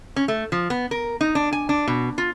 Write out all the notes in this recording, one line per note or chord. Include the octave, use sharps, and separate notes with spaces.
C#4
A3
F3
B3
A#4
D#4
D4
G#5
D4
B2
F4